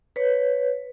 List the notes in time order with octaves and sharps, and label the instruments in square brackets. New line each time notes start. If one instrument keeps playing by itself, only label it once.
[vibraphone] B4 C#5